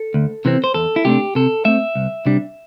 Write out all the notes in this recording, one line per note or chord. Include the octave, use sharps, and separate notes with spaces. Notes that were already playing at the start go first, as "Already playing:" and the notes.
Already playing: A4
D2
C3 E3 C4
C5
E2 A4
E4
C3 A3 D4 G4
C3 A4
A3 C4 E5
C2
C3 G3 D4